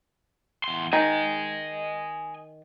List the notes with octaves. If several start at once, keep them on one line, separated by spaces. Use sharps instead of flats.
E2 C6
D#3 D#5 G#5